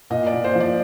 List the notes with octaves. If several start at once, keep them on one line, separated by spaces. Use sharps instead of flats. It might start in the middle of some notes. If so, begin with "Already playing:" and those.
A#2 D#5
D5
A#2
C5
F3
D5